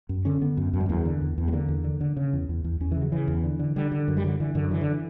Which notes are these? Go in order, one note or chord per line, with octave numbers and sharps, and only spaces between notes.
F#2
D3 C#4
D3 B3
F#2
F#2
G3
E2 A#3
D3
E2
E2
G3
D3 A#3
E2
D3
D3
C#3
E2
E2
E2
E2 C#4
C#3 E3
F#3
C#3 E3
E2
D3
D3
D3 G3
D3
F#2
G3
D3 F#3
D3 E3
F#2 D3
D3 E3
D3
E3